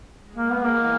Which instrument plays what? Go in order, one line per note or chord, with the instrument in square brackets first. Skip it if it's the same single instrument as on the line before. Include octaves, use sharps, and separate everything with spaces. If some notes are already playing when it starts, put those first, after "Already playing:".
[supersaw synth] G#3
[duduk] A#3
B3
[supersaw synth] E3 [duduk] A#3